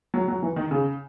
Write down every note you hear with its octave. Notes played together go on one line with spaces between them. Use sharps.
F#3
F#3
E3
D#3
C#3